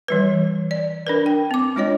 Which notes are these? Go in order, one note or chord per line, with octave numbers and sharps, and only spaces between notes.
E3 G3 B4
D5
D4 A#4 B4
G5
C4 D6
G#3 D4 F4 C#5 D#5